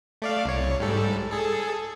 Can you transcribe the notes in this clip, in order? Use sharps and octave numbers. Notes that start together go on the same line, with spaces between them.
A3 D5 F5
C2 C#5
G#2 G3 A4
G#4 A4